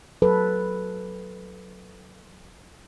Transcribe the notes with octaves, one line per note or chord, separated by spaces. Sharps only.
F#3 A4 B4